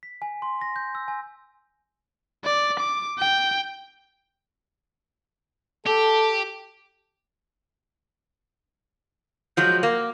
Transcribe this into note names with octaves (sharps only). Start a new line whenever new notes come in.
B6
G#5
C6
A#6
G6
E6
G#5
D5
D6
G5
G4 A4
F3 F#3 G#3 G6
A#3 D6